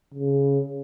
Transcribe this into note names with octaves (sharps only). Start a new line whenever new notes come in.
C#3